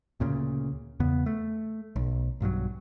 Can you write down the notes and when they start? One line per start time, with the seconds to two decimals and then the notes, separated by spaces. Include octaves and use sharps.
0.20 D2 A#2 C#3
1.00 E2 C#3 B3
1.26 A3
1.96 B1
2.40 B1 G2 F3 F#3